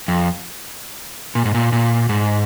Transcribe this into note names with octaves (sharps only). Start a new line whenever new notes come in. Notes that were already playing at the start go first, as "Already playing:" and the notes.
F2
A#2
G#2
A#2
A#2
G#2